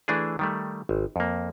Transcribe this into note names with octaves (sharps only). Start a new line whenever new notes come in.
E3 A3 D4 G#4
D#3 G3 A3
G#1
F2 A#3